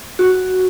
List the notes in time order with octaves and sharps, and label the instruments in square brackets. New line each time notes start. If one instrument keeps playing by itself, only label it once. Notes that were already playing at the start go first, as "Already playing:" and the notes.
[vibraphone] F#4